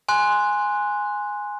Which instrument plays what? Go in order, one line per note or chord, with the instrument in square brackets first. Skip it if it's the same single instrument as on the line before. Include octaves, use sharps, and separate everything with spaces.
[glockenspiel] G#5 C6 F#6